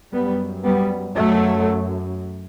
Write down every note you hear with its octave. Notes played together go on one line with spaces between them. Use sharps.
F#2 G3 B3
G3 B3
F#2 F#3 A3